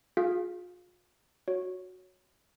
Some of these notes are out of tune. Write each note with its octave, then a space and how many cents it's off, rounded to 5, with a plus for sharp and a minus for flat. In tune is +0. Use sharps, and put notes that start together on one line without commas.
F4 +40 G#4 +0 F5 +0
F#4 -10 C#5 +0